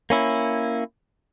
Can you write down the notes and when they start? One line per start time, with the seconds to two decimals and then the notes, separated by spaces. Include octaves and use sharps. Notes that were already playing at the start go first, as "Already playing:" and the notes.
0.10 A#3 C#4 E4